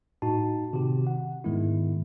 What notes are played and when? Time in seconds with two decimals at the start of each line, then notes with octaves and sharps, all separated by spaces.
0.22 A2 D#4 F#4 A5
0.73 C3 D#3 F#4 G4
1.07 F#5
1.44 G#2 D#3 G#3 B3 E4